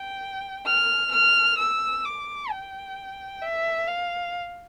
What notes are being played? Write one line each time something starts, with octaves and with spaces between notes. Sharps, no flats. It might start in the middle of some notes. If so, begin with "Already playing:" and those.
Already playing: G5
F6
F6
E6
D6
G5
E5
F5